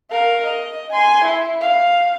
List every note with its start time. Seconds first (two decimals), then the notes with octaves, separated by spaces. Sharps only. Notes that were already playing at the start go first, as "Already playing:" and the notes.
0.10 A#4 F5
0.46 D#5
0.93 G#5 C6
1.25 E4
1.61 F5